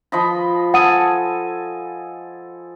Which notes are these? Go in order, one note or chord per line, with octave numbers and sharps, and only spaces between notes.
F3 D#5 B5
A4 F#5 G#5 D#6 D#7